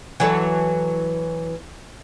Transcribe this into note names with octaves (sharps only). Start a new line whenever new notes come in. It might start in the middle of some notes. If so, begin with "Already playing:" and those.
E3 F#3 A4